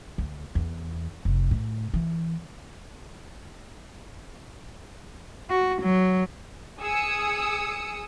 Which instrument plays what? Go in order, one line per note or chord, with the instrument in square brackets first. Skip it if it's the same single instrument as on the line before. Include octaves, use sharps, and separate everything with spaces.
[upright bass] D2
E2
F1
A2
E3
[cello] F#4
F#3
[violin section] G#4 D#6 E6 C#7